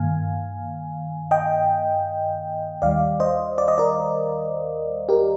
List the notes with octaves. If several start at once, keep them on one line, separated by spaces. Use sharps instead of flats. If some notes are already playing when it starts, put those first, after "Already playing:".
Already playing: G2 D#3 A#3 F5 G#5
D#5 G5
D#2 D#3 G3 D5 F5
C5 D#5
D5
D#5
A#4 D5
G4 A#4